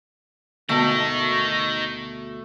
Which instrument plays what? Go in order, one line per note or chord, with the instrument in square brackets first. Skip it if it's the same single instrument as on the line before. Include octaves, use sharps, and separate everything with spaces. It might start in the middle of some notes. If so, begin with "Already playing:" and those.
[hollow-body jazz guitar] D2 B2 [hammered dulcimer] A3 [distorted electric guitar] D#4 A#4